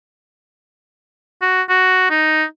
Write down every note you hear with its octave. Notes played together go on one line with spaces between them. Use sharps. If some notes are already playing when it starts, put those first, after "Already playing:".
F#4
F#4
D#4